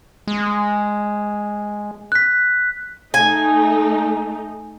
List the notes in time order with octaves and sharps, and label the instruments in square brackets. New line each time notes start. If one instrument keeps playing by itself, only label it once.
[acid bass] G#3
[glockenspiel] F#6 B6
[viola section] A3 D#4 [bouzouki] G#5